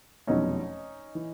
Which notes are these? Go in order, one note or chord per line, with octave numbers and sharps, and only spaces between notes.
F1 E2 B2 F#3 C#4 D#4
E3